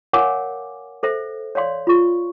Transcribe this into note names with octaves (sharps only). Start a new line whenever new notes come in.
A#4 C#5 F5 F#5 G#5 D6
A4 C5 E5
C#5 D5 F5 C6
F4 C#6